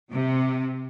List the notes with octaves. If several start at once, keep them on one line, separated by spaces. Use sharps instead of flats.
C3